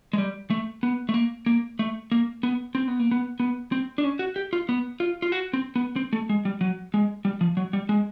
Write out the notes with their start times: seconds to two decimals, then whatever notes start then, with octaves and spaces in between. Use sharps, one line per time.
0.13 G#3
0.18 G3
0.50 A3
0.83 B3
1.09 A3
1.14 A#3
1.46 A#3
1.79 A3
2.11 A#3
2.43 B3
2.75 C4
2.88 B3
2.99 A#3
3.11 B3
3.40 B3
3.72 C4
3.98 D4
4.04 C#4
4.19 F#4
4.36 G4
4.53 F4
4.69 B3
5.00 F4
5.22 F4
5.32 F#4
5.53 C4
5.76 B3
5.96 C4
6.13 A3
6.29 G#3
6.45 G3
6.61 F#3
6.94 G#3
7.25 G3
7.41 F3
7.57 F#3
7.73 G3
7.89 G#3